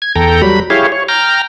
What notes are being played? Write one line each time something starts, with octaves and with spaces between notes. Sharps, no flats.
G#6
E2 A4 G5 A#5
F#3 G3 B5
E4 G4 G#4 C#5 F5
C#5
G5 A#5 F6